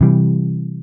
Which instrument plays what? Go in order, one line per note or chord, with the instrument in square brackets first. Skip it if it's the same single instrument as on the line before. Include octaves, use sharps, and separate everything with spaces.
[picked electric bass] C3 E3 G3